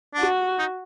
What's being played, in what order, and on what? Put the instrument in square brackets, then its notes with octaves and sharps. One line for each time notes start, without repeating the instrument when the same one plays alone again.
[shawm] D4 [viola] F#4
[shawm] D#4